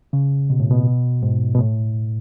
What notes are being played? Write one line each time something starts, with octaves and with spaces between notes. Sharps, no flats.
C#3
B2
A2
B2
G#2
B2
A2